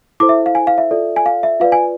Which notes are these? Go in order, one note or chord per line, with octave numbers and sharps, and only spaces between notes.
E4 A4 C5 D6
E5
F5
G#5
F5
E5
F4 A4 D5
G#5
F5
E5
F4 B4 D5 F5
G#5